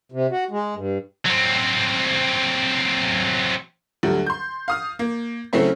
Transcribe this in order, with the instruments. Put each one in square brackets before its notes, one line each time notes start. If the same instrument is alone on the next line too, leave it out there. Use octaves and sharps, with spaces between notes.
[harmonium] C3
F#4
G#3
G2
[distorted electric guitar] F#3 C4
[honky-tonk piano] D2 F#3 G3 A3
C6 G6
F5 D#6 F6
A#3
C#3 F#3 A3 C4 C#4 E4